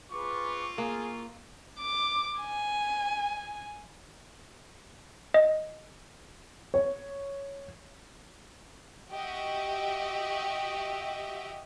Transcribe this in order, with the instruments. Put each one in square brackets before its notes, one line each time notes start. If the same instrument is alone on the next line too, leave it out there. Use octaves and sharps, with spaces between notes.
[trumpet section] C4 F4 [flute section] G#4 B4 D6 [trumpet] C#6
[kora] A#3 [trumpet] G#4 [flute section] C#6
[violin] D6
G#5
[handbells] D#5
[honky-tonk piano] C#5
[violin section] F#4 G4 D#5 E5